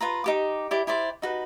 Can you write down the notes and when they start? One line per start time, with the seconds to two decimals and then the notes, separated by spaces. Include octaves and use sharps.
0.01 F4 B4 A#5
0.24 D#4 G4 D6
0.71 E4 G4 D5 D6
0.87 E4 G4 C5 D5
1.22 D#4 F#4 B4